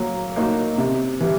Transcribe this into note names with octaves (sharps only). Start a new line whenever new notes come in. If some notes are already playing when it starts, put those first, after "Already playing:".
Already playing: F#3 A#3
A#3 D#4 F#4
C3
E3 G3